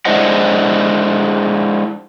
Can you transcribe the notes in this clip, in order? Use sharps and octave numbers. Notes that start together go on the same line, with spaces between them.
G#3 D4 E4 C5 D#5 F#5